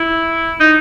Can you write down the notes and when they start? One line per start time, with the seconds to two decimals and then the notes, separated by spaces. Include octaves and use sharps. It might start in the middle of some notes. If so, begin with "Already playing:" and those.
Already playing: E4
0.60 D#4